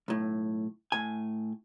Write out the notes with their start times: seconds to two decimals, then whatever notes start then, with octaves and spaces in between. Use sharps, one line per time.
0.08 B1 A2
0.92 A2 G#5